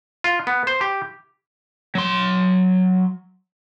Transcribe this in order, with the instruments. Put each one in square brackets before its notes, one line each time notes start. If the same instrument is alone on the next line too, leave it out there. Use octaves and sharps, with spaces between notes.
[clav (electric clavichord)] F4
B3
C5
G4
[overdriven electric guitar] F#3 C6